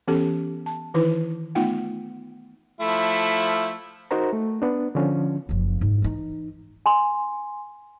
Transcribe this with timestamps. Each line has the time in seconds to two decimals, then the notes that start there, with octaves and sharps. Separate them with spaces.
0.08 E3 B3 C#4 G4 A4
0.66 A5
0.94 D#3 E3 D#4 E4 B4
1.55 A3 B3 D#4 F4 F#5 G5
2.81 F3 A3 E4
4.11 D#4 F#4 A#4 C5 A#5
4.33 A3
4.62 B3 D4
4.95 D3 F3 C#4
5.49 F#1 F3
5.81 G#2
6.02 E3 D#4
6.86 G#5 C6